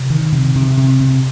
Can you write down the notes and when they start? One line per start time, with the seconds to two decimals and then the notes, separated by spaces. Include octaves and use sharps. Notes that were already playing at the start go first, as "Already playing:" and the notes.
Already playing: C3
0.10 D#3
0.32 C3
0.55 C3
0.77 C3
1.00 C3